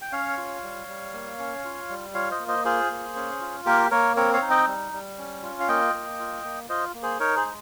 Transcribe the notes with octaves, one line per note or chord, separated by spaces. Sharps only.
G5
C#4 C#5 F5
F4
G3
G3
A#3
C#4
F4
G3
F4 C#5 F5
C5 D#5
A#3
C5 D#5
F4 G#4 C5
A#3
C#4
F4
A#3 G4 A#4
A#3 A#4 C#5
C4 A#4 C#5
C#5 F5
D#4
D#5 G5
G3
G3
C#4
F4
F5
A#3 D#5 G5
A#3
F4
A#3
F4 C5 D#5
A#3
G#4 C5
D#4 A#4 C#5
G#4 C5
G#3